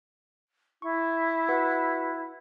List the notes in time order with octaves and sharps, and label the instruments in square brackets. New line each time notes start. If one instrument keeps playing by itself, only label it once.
[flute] E4 [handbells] C#6
[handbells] F#4 B4 F#5